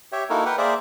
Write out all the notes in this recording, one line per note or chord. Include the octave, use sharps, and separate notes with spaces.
G4 C#5 E5 G5
A#3 D#4 E4 F#4 A4 A#4
A#4 B4 F#5 G5
A#3 G#4 A#4 C5 D5 E5